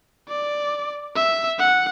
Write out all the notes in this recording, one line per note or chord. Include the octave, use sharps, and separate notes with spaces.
D5
E5
F#5